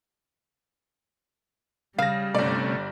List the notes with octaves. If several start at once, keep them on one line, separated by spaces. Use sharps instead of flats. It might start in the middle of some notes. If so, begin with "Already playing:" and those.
C#3 G3 F5 A#6
G1 C3 A3 C#4 D5